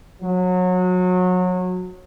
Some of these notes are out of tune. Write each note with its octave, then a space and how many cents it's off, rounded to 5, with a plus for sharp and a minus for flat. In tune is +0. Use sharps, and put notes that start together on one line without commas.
F#3 -25